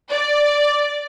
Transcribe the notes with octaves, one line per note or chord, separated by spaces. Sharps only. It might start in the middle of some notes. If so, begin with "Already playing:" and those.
D5